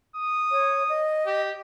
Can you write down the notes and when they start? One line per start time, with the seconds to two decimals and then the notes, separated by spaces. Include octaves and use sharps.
0.16 D#6
0.51 C#5
0.89 D#5
1.26 G4